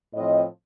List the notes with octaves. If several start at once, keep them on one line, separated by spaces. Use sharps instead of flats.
A2 F3 C4 D#5